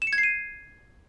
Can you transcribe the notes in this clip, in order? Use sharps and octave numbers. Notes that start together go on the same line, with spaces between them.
E7
C#7
G#6
C7
D#7